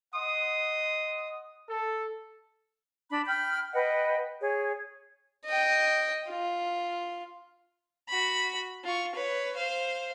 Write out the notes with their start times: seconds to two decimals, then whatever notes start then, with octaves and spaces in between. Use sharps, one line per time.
0.15 D#5 F#5 C6 D#6
1.70 A4
3.09 D4 B5
3.26 G5 B5 F6 G6
3.73 B4 D#5 F#5 G5
4.41 G#4 C#5
5.46 D#5 G5
6.30 F4
8.09 F#4 B5
8.84 F4 C#6
9.15 B4 C#5
9.56 C5 F5